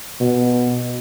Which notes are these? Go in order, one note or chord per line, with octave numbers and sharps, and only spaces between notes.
B2